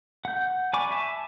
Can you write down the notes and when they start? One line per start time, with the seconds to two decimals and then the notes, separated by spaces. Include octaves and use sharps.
0.25 F#5 G6
0.73 D5 G#5 B5 C#6 D6
0.91 E5 G#5 A5